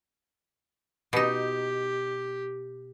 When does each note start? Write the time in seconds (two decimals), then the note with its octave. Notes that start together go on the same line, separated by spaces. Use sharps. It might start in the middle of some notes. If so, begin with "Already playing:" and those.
1.13 B2 D#4 G4